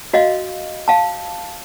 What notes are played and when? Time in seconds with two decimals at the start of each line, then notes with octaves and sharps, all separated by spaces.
0.14 F#4 D#5 F5
0.88 F5 A5